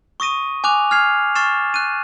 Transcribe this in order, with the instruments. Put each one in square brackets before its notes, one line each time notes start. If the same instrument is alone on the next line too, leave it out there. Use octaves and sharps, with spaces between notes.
[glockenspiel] C#6 D#6 A#6 D#7
G#5 D6 F#6 F7
F6 G#6 C7 F7
C#6 F6 A6 C7 E7
F#6 D#7